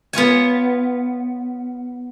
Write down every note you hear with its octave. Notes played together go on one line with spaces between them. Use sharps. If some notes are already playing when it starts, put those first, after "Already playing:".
B3 F4 C#5 G#5